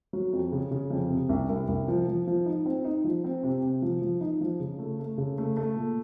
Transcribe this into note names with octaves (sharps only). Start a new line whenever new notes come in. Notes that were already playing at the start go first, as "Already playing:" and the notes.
F#3
F2
C#3
C#3
F2
C3
C2
C2
C2
F3
F3
F3
D#4
C4
D#4
F3
C4
C3
C3
F3
F3
D#4
F3
C#3
A3
A3
C#3
A3
A3
A#2